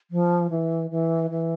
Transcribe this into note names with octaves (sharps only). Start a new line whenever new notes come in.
F3
E3
E3
E3